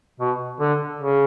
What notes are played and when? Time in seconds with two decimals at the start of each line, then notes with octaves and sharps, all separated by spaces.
0.20 B2
0.60 D3
1.00 C#3